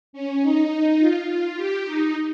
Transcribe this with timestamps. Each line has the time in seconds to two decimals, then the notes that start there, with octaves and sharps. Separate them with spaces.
0.13 C#4
0.41 D#4
0.98 F4
1.28 F4
1.56 G4
1.85 D#4